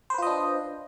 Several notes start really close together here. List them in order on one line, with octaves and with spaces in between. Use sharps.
C5 B4 F4 D#5 D4